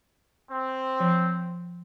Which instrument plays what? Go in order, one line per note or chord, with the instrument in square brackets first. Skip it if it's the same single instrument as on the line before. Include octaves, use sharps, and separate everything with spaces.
[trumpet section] C4
[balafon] F3